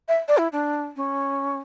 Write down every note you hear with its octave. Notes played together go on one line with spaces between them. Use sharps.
E5
D5
E4
D4
C#4